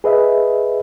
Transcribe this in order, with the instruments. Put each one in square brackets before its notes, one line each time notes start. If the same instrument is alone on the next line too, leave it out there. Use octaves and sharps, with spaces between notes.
[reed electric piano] G#4 B4 D#5 E5